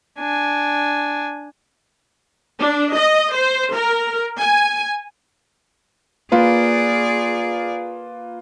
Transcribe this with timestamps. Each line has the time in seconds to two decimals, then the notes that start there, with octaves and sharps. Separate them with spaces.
0.18 D4 G#5
2.60 D4
2.95 D#5
3.34 C5
3.75 A#4
4.40 G#5
6.32 A#3 F4 G#4 B4 D5